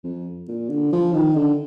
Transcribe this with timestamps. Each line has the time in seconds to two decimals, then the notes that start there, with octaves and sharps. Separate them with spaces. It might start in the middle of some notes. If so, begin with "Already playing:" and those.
0.04 F2
0.48 A#2
0.69 D3
0.92 F3
1.13 D#3
1.36 D3